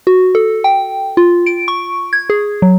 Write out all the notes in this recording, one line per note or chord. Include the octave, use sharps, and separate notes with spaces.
F#4
A4
G5
F4
D7
C#6
G#6
G#4
F#3